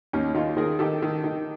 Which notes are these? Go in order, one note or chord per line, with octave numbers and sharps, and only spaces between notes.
D#2 C#4 D#4
D#3 D#4 F4
D#3 G#4 A#4
D#3 G4 A4
D#3
D#3